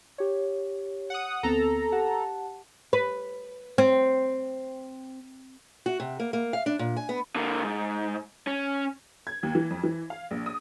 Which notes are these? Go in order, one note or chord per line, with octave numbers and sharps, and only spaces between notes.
G4 C#5
F#5 D#6
D2 B3 C4 A4 A#5
G4 F#5 A5
B4
C4
F#4
C3
A#3
A#3
F5
D4
A#2
G#5
B3
D3 A#3
G#2
C#4
G#6
D#2
E3
F2
E3
F5
A#1
D#6